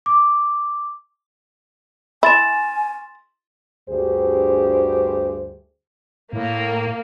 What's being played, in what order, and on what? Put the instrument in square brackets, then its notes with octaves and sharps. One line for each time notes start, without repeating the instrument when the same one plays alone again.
[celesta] D6
[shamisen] E4 [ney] G#5 [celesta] C6 A6 E7
[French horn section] D2 G2 G4 G#4 C5
[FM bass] A2 [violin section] A#3